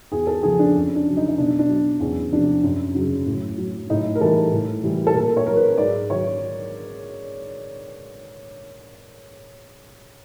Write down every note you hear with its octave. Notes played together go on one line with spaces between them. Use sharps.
E2 G#4
A4
C#3 F3 G#4
D4
F2 C#4
D4
C#3 F#3
D#4
D#4
B2 D4
D4
F#3
E2 C#4
C3 F3 D4
F#2
C#3 F#3
A2
F#3
A2 D#4
A#4
E3 G3 A4
A2
E3 G3
A4
A#2 A#4
C#5
F#3 A#4
B4
G#2 D5
D#3 F#3 C#5